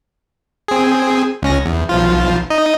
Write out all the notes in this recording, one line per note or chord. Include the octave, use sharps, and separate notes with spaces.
C4 G#4
C#2 C#4 A#6
E2
B1 F3 F4
D#4 D#5